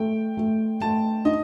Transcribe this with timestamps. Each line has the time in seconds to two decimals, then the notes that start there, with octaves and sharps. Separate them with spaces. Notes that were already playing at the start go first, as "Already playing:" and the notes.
Already playing: A3 G5
0.37 A3
0.81 A3 A5
1.25 D#4 D#5